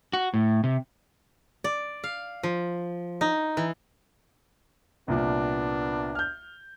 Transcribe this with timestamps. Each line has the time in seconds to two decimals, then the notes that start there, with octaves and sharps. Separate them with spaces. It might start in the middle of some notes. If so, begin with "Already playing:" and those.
0.13 F#4
0.34 A2
0.64 C3
1.64 D5
2.04 F5
2.43 F3
3.21 D#4
3.57 E3
5.08 C2 A#2 B3 D4
6.15 F6 G6